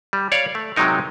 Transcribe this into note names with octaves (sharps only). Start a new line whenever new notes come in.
G3
C#5 D5 F5
A3
C3 F#3 G#3 D#4 A#4